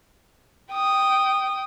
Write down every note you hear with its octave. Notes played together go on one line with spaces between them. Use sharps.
G5 D#6